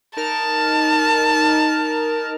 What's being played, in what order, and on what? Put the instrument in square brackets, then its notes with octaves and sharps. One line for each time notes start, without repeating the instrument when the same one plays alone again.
[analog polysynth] D#4 A#4 F6 [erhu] A5